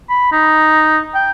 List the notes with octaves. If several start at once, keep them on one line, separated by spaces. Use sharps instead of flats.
B5
D#4
G5